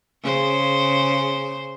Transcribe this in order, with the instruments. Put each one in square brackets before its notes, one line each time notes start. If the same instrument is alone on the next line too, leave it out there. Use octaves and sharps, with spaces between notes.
[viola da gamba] C#3 C5